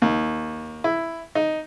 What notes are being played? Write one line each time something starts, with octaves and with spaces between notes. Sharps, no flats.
D#2
E4
D#4